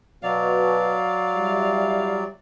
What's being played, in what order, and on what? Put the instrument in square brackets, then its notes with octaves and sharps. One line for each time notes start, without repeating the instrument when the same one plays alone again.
[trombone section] B2 [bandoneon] F#3 D5 [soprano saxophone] F5
[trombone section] G3 E4